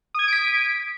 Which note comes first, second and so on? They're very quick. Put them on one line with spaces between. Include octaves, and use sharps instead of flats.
D#6 G#6 D#7 D7 B6